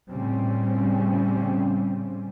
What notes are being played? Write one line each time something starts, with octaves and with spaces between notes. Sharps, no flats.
A2 C#3 G3 C4 C#4